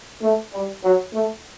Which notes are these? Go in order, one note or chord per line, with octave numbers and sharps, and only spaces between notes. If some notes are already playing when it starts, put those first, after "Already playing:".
A3
G3
F#3
A3